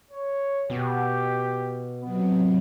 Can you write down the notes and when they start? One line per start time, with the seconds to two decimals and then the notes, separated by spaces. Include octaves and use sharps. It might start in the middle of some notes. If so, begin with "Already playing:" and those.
0.11 C#5
0.70 B2 G4
2.03 C3 F#3 B3